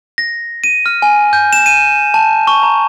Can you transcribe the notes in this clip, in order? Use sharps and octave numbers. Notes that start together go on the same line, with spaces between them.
A#6
D#7
F6
G#5
G6
E7
D#7
A5
C#6
A#5